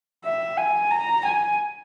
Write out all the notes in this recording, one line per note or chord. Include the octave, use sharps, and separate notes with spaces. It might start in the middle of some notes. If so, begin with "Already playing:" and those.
E5
G#5
A#5
G#5